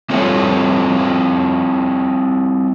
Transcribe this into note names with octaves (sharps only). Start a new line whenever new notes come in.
G3 C4 F4 A4 C#5 G5